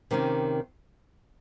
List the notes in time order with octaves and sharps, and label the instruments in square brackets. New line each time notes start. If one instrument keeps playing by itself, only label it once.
[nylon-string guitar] C3 D#3 A#3 C#4